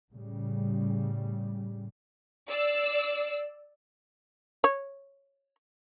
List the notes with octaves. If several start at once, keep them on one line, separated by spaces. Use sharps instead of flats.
A2 C#3 G3
D5 E6 C7
C#5